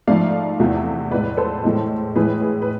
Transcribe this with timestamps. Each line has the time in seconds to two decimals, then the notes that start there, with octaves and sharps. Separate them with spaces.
0.07 G#2 F3 A3 D5 F5
0.60 E2 C3 E3 A3
1.11 A2 G#3 B4 D5
1.37 A4 C5
1.63 A2 E3 G#3
2.16 A2 E3 G#3 G#4 B4
2.42 G#4
2.62 B4